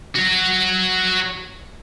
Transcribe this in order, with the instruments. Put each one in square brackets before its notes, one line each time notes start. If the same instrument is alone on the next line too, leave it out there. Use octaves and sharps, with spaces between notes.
[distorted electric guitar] F#4 C#5